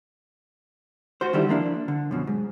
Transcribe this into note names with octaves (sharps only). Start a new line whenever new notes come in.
F#4 C5
D3 D#3 G3 E4
F3 A#3 D4 E4
D3
F#2 B2 F3
G#2